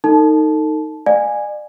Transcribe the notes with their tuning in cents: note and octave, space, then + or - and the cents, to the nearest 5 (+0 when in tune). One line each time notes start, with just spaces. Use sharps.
D#4 +0 A4 +40 A5 -20
D5 +35 F5 +10 G#5 -10